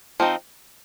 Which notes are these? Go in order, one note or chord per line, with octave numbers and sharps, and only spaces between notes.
F3 C4 D#4